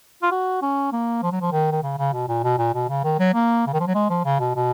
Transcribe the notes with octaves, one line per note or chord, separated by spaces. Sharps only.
F4
F#4
C#4
A#3
F3
F#3
F3
D#3
D#3
C#3
C#3
B2
A#2
B2
A#2
B2
C#3
D#3
F#3
A#3
C#3
D#3
F3
F#3
G#3
F3
C#3
B2
B2